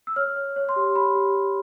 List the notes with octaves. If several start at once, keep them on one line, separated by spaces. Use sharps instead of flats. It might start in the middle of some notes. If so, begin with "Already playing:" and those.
E6
C#5 F6
C#5
C#5
C6
G4
G4 B5
G4
G4